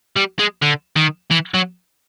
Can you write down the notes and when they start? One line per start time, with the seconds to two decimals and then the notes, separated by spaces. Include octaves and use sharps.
0.16 G3
0.39 G#3
0.62 D3
0.96 D#3
1.31 E3
1.54 F#3